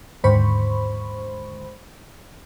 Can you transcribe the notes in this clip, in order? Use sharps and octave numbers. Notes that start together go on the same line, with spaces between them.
D#2 G#2 D3 C5 B5 C#6